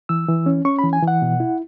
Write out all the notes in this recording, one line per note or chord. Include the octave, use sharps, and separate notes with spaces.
E3 E6
E3
C#4
C#4 C#6
B5
E3
G#5
E3
F#5
B2
E4